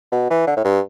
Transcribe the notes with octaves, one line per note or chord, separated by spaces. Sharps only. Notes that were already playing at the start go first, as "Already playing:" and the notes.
B2
E3
D3
A2
G2